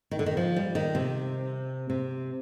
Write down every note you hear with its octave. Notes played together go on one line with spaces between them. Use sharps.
D#3
D3
D#3
F3
G3
D#3
C3
C3